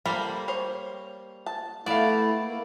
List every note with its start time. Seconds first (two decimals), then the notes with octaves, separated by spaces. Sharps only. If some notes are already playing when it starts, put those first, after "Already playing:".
0.06 G3 A#3 A4 C5 B5
0.48 C5 C#5
1.46 A5
1.86 A3 B3 E4 D5 F5 A5
2.44 A#3